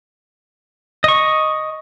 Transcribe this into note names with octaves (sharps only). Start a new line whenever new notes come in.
D#5 C#6